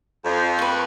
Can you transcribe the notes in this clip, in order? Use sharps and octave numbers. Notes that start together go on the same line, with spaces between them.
F2
B4 C#6